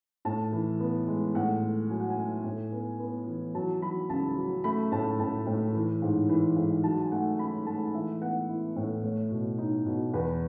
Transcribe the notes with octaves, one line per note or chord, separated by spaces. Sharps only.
A2 A5
E3
B3
G#3
A2 F#5
A3
F#3 G#5
F#5
G#5
A3
A2
B3
B3
E3
F#3 A5
F#3 B5
C#2 A5
F#3
A3 B5
A2 A5
A2 A5
A2
E3
G#2
E3
G#2
F#3 A5
G#5
A3 F#5
C#4 B5
A3 A5
E3 E5
B3 F#5
E4
A2
A3 C#5
B2
D#4
B2
E2 B4